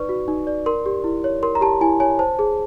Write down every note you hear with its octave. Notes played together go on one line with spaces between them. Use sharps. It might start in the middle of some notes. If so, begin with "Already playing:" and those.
Already playing: D#4 B4 D5 C#6
F#4
D#4
D5
A#4 C6
G4
E4
C#5
A#4 C6
A#5
G4 A5
E4 G#5
C#5 G#5
C5 A5
G#4